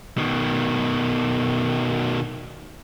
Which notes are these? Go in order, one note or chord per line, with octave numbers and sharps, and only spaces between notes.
B2 D#3